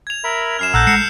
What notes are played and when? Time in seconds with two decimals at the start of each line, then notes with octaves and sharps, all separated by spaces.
0.07 G#6 F7
0.24 A#4 E5 B5
0.59 F#2 F6 C7 E7
0.74 A#1 A4 F#5 A#5 E6 F#6 G6
0.87 G#3 C7 C#7 E7